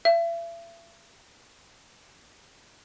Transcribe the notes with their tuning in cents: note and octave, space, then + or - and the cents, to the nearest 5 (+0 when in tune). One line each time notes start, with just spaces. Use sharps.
E5 +40